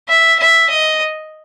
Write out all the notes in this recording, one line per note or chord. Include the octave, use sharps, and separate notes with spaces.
E5
E5
D#5